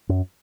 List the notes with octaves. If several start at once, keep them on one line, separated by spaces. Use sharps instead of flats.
F#2